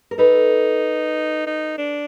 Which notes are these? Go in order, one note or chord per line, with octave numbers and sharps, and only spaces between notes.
A#4
D#4 A4 B4
D#4
D4